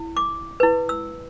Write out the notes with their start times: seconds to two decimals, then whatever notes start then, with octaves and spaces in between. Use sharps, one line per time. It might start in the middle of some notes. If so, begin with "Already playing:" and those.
Already playing: E4
0.17 D6
0.60 E4 B4
0.89 E6